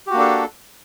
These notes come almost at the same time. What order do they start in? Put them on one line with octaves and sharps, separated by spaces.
G4 F#4 A#3 D4 A4